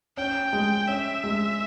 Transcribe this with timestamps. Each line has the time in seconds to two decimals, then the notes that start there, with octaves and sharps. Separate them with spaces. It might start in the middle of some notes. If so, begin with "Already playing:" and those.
0.17 C#4 G5
0.53 G#3
0.88 C#4 E5
1.24 G#3